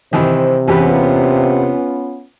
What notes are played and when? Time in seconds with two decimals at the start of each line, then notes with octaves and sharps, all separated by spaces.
0.13 C3 D#3 E3 C5
0.68 E2 B3 C#4 F4 G4 B4